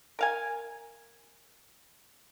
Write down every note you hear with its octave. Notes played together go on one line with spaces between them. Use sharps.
A#4 F5 G#5